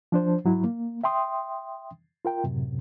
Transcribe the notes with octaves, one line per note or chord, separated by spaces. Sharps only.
F3 D4 C5
G#2 F#3 E4
A#3
E5 G5 C6 D#6
F4 A#4 G5
F#2 A2 C3